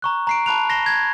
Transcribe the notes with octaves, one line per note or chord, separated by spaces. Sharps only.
A#5 C#6 F#6
A#5 C7 D7
A5 B5 F#6 F7
A#6 C7 E7 G7
G#6